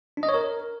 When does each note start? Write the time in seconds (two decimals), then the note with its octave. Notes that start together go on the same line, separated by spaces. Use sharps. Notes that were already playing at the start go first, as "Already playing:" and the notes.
0.17 D4
0.23 D#5
0.29 C#5
0.34 A#4